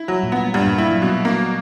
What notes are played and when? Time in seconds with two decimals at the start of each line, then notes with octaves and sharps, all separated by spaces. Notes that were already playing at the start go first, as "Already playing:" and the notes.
Already playing: E4
0.08 F#3 G3
0.23 A#2 A#3
0.32 B3
0.39 G3
0.54 G2 G3
0.66 A#2 A#3
0.78 G3 E4
0.90 F#3
1.02 B2 G3
1.25 A#3